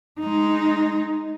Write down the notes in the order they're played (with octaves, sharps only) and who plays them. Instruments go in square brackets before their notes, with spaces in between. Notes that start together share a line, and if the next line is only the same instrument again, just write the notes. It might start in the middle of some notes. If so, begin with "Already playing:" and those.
[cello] G#3 D#4